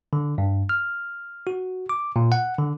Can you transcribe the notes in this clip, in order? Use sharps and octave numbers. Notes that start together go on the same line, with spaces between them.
D3
G2
F6
F#4
D6
A#2
F#5
D3